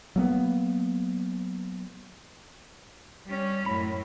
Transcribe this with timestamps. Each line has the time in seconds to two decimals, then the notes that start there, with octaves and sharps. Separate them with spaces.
0.16 F#3 A#3 B3
3.27 G3 C#4
3.66 F#2 A2 B5